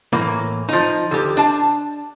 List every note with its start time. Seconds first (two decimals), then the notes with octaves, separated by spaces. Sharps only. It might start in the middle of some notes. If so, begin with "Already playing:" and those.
0.13 A2 E3 A#3
0.69 F3 D#4
1.11 D2 G4
1.37 D4 A5